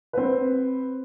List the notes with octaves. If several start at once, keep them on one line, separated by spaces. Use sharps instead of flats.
C4 B4